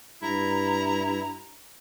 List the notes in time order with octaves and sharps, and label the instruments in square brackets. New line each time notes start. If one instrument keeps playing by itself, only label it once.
[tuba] G2 [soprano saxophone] E4 [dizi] A#5